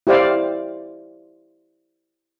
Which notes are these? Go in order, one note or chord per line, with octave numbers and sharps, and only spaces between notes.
E4 G4 C5 D5 F5